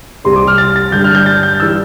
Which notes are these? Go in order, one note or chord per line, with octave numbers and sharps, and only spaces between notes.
C2 C3 G3 C6
D6
F6
A6
A6
G2 D3 G3 G6
F6
G6
A6
G6
E3 G3 E6